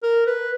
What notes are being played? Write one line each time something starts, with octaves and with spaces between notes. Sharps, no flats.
A#4
B4